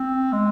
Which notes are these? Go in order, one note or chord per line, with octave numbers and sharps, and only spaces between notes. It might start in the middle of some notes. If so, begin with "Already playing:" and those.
Already playing: C4
G#3